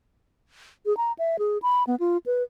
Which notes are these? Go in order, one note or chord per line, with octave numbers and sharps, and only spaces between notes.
G#4
A#5
E5
G#4
B5
B3
F4
B4